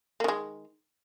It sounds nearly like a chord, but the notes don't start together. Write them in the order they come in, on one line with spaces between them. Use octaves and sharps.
A#3 D#3 G#3